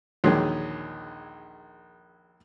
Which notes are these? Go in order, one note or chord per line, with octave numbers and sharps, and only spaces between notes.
A#1 D#2 D3 D#3 F#3 G#3